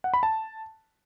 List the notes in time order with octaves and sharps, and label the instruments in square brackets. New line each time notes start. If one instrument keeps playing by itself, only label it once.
[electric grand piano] F#5
B5
A5